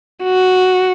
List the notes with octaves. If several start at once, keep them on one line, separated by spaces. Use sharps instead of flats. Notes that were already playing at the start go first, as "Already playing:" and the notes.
F#4